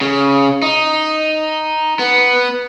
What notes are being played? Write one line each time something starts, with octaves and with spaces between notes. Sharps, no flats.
C#3
D#4
B3